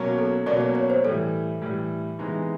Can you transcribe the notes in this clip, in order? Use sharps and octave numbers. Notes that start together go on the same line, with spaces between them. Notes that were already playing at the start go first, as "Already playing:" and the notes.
Already playing: B2 F#3 A#3 C#4
A4
B2 F#3 A#3 C#4 D5
C#5
C#5
C5
A2 E3 G3 A4
A2 E3 G3
C3 E3 G#3 B3 D#4